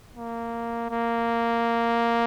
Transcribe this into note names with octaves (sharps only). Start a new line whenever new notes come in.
A#3
A#3